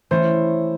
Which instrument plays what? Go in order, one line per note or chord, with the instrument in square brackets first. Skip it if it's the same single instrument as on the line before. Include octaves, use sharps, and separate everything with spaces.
[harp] E3 A3 C#4 [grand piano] C5